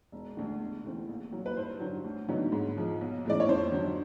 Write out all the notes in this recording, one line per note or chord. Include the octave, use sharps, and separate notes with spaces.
E1
D2 D3
E2
C3 E3 A3 C4
A#1
A#2 F#3
B4
G2 C5
D3 F#3
D2
D3 F#3 B3 D#4
G#2
F3 G#3
B1
A2 E3 G#3 C#4 D5
C#5
F2 C5
D3 F#3